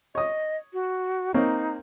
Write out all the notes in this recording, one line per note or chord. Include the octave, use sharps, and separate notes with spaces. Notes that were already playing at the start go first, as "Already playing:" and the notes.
C#5 D#5 D#6
F#4
A#3 C4 D#4 C#5